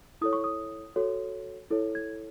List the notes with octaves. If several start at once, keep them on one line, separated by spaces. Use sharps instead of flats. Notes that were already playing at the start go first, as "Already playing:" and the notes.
E4 A4 C#5 D#6
C#6
D#6
F#4 A4 C#5
E4 A4 C#5
G#6